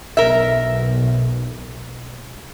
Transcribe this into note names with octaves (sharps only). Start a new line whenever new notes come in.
B1 A#4 E5